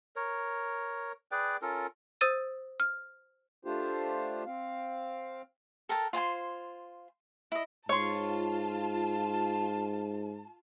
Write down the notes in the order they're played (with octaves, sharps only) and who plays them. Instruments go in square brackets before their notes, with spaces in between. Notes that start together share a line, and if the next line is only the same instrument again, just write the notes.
[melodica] A#4 C#5
G#4 B4 D5 G5
C#4 F4 A4 A#4
[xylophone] C5 D#6 E6 A6 D#7
F6
[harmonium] A3 D4 F4 G4 C5
C4 F5
[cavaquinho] A4 A#4 G5 A5
F4 C5 G#5 C6
E4 D#5
[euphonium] G#2 [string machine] F4 [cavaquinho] C#5 C6 [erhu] A5